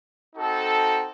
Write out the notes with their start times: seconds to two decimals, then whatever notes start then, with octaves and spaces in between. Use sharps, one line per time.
0.35 C4 D#4 F#4 A4